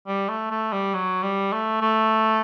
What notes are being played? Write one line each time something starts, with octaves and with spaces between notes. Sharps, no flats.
G3
A3
A3
G3
F#3
G3
A3
A3